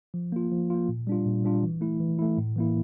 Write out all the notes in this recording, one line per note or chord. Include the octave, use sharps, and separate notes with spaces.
F3
A#3 F4
F3
A#3 F4
A#2
G3 D4 F4
A#2
G3 D4 F4
E3
A3 E4
E3
A3 E4
A2
E3 A#3 E4